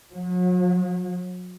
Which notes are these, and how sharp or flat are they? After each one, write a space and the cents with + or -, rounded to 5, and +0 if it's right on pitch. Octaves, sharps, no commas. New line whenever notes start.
F#3 -40